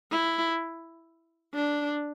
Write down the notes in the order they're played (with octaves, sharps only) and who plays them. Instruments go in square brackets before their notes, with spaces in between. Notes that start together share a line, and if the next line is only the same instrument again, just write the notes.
[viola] E4
D4